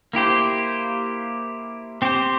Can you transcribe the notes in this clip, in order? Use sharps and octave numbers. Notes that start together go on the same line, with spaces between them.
A#3 E4 G4 C5
C4 G4 C5